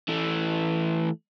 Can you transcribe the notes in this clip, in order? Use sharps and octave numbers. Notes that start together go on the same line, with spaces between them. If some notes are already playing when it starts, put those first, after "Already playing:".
E3 A3